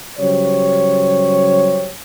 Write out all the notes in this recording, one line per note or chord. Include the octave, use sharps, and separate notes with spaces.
C#3 F#3 G3 G4 C5 C#5